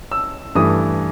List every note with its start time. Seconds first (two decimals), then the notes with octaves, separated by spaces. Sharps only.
0.12 E6
0.55 G2 E3 A3 D#6